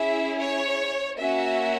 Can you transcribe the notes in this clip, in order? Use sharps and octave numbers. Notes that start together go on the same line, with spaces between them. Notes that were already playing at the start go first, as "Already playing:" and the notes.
Already playing: C#4 E4 G#4 E5
C#5
A#3 C#4 F#4 E5